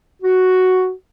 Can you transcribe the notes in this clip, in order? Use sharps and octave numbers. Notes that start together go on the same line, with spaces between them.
F#4